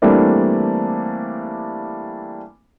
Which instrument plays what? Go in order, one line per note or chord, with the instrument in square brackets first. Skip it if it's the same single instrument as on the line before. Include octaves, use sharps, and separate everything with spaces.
[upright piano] E3 G3 A3 A#3 C4 D4